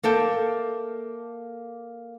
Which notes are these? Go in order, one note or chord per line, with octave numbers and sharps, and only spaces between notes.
A#3 A4 E5 G5